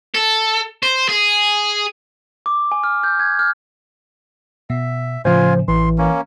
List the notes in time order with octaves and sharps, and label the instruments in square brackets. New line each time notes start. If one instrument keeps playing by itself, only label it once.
[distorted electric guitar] A4
C5
G#4
[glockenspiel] D6
G#5
F6
G6
G#6
F6
[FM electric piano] B2 [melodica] E5
[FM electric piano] A2 C#3 [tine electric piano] F3 C5 [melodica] F4 G#5
[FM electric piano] A1 [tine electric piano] E3 [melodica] C6
[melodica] A#3 C#4